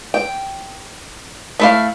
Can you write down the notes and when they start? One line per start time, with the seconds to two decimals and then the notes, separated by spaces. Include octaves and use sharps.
0.14 G5
1.60 A3 E4 F5